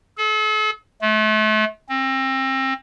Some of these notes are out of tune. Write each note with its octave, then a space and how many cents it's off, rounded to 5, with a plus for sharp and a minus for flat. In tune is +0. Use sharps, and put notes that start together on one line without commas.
A4 -40
A3 -35
C4 +30